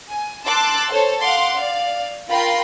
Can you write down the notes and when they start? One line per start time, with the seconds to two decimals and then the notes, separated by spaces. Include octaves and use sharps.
0.11 G#5
0.44 A5 C6 D6 E6 F#6 A6
0.90 A4 C5 C#5
1.21 F5 F#5 C6 D6
1.57 D5 F5
2.29 F4 A#4 F5 G5 B5 C6